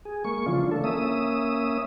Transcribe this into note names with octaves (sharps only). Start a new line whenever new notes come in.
G#4
G#3 A#3 C#6
C#3 E3 F3 D4 F4
A3 A4
A#3 C#4 E5 D#6